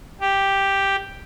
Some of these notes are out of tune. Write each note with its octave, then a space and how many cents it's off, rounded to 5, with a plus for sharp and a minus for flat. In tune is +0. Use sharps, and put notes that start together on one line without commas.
G4 +0